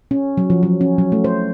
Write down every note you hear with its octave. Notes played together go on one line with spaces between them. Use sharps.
C#4
F#3
F3
F#3
C#4
F#3
A3
C5